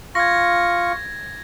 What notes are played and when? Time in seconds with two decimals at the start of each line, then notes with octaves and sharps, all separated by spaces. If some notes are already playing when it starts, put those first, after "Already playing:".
0.15 F4 C#6 G#6 A#6